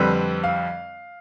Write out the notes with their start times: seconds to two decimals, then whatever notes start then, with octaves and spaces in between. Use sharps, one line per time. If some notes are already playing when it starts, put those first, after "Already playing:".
Already playing: F2 D3 G3 C4 B4
0.44 F5